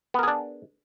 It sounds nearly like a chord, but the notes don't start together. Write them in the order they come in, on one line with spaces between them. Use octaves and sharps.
B3 A#4 G#4 D4